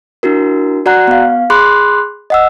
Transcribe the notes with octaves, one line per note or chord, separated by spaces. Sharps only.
D4 E4 F#4 A#4
F#4 D5 F#5 A#5 F#6
B3 F5
G#4 B5 C6 D6 F#6
D#5 F#5 E6